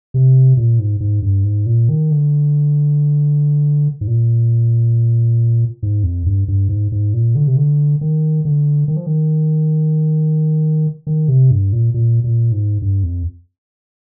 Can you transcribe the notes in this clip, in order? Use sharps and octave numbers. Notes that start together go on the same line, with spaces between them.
C3
A#2
G#2
G#2
G2
G#2
A#2
D#3
D3
G#2
A#2
G#2
F2
G2
G2
G#2
G#2
A#2
D3
C3
D3
D#3
D3
D#3
F3
D#3
D#3
C3
G2
A#2
A#2
A#2
G#2
G2
F2